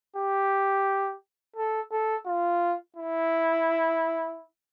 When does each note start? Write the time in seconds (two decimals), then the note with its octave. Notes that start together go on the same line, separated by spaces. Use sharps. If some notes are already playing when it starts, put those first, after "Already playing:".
0.16 G4
1.56 A4
1.91 A4
2.26 F4
2.96 E4